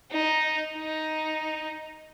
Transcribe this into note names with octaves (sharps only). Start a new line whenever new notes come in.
D#4
D#4